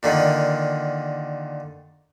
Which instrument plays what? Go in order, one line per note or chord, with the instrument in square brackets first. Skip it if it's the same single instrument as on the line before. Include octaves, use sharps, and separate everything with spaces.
[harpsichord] A#2 D3 D#3